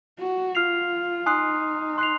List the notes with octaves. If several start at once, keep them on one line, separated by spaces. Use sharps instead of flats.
F#4
F4 F6 C7 F7
D#4 G#5 C6 D#6 F#6 C7
C6 F#6 C7 F7